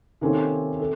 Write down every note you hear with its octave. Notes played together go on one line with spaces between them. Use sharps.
C3 D#3 A#3 C#4 A4 C5
A4